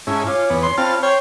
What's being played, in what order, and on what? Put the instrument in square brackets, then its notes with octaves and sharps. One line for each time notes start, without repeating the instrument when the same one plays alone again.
[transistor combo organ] G#2 C#4 E4 [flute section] A5
[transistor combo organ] F4 [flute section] C#5 G#5 D6
[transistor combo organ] E2 B3
[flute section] C#5 B5 [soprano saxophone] C6
[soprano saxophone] C4 [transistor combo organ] F4 A5 F6
[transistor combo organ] C5 G5 [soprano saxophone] C#5